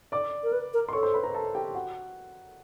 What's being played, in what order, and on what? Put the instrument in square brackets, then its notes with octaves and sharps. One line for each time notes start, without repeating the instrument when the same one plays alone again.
[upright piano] D5 D6
[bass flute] A#4
B4
A#4
[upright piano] C6
[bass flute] A4 [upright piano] C#5 C#6
[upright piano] C5 C6
B4 B5
A#4 A#5
A4 A5
G4 G5
F#4 F#5